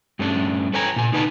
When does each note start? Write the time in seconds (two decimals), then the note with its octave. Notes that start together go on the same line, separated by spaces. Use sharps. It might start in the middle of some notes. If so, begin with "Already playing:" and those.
0.19 G2 A3 C#4 D4
0.74 A4 B4 C#5 G5 G#5 A#5
0.96 A#2 G#5
1.13 D3 D#4 B4 D5 A5